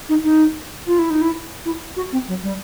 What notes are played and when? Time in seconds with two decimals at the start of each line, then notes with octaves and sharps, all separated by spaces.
0.09 D#4
0.24 D#4
0.87 F4
0.99 E4
1.10 D#4
1.21 E4
1.65 E4
1.96 F#4
2.12 C4
2.28 F#3
2.43 G3